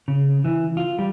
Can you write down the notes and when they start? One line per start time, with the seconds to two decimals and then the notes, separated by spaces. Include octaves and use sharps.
0.08 C#3
0.44 E3
0.77 F4
0.99 G3